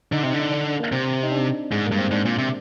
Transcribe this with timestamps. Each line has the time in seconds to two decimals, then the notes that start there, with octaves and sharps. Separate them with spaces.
0.12 D3 D#4
0.23 C3 D#4
0.34 D3
0.39 D#4
0.52 D4
0.80 A#3
0.92 C3 C4
1.23 D#4
1.32 D4
1.72 G#2 G#3
1.86 A#3
1.92 G2
1.99 C4
2.11 G#2 D4
2.25 A#2
2.38 C3